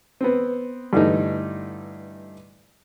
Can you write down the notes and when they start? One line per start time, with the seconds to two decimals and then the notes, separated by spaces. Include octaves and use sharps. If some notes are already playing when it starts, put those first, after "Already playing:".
0.21 B3 C4
0.93 G2 D3 E3 A3 D#4